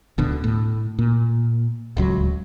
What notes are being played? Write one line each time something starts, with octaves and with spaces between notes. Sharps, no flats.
D1 B2 D3
A2
A#2
D1 C#2 F#3